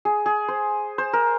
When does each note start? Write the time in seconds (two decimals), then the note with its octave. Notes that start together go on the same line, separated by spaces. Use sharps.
0.05 G#4
0.26 G#4
0.48 C5
0.98 C5
1.13 A#4